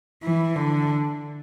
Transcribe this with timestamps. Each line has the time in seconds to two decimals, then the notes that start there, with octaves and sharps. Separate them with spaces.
0.23 E3
0.56 D3